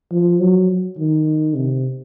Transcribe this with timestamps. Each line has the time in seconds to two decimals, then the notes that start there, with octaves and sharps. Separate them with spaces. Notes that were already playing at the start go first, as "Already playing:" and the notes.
0.12 F3
0.40 F#3
0.98 D#3
1.55 C3